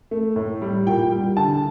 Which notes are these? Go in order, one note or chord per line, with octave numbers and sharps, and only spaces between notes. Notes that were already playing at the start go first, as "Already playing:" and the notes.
A3
A2
G3
A#2 G5
G3
D3 A5